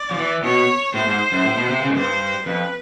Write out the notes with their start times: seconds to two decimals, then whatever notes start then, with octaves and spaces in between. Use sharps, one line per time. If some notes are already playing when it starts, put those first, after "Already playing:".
Already playing: D5
0.11 F3
0.18 E3
0.43 B2 C#5
0.94 A2 C5
1.07 G#2
1.32 F#2
1.45 A2
1.57 B2
1.70 C3
1.83 C#3
1.90 G#2
1.96 G2 C5
2.46 F2 B4